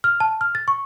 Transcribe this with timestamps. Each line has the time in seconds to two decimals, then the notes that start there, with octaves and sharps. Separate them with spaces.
0.04 F6
0.20 A5
0.41 F6
0.55 A6
0.68 C#6